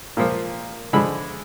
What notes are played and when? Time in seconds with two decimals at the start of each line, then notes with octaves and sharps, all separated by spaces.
0.17 A#2 F3 A#3
0.93 D3 F3 G#3 B5